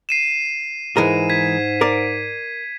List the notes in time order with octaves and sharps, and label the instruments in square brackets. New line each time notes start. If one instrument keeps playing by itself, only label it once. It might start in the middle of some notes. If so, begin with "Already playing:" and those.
[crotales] C7 D#7 E7
[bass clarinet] G#2 [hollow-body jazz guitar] E3 G#3 A#4 [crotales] D#7
[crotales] G#6 B6
[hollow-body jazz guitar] A#4 D5